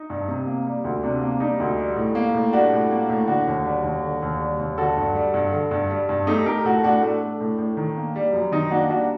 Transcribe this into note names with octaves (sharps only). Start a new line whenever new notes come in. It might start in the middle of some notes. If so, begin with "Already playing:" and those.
Already playing: D#4
G2
C3
A#3
G3
D2
C3 D4
A#3
G3 D#4
D2
G3
A2
A#3
A2
G3 D4 F#4
A2
A#3
A2
D3 D4 F#4
D#2
G3
D#2
D3
D#2
G3
D#2
D3 F#4 A4
G2
G3
G2
D3
G2
G3
G2
A3 D#4 G4
A3 G4 A#4
A2 F#4 A4
A2 D4 F#4
A3 D4
A3
A2
A2
D#3
A#3
G3
F#2
D#3 D#4
A#3 D4 F#4
G3 D4 F#4